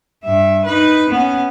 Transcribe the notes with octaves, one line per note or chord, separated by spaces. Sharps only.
G2 E5
D#4 B4
B3 C#4